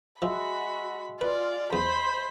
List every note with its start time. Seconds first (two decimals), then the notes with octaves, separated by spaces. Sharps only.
0.22 F3 G#3 F#4 E5 B5
1.21 F4 B4 D5
1.73 E2 C5 B5